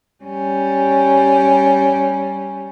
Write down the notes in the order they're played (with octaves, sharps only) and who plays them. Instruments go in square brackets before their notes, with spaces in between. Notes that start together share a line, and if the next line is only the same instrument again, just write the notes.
[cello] G3 C#4